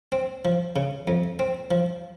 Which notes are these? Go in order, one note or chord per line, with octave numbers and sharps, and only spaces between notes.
C4
F3
C#3
F2
C4
F3